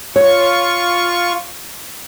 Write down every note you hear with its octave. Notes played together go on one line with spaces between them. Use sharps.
F4 C#5 C#6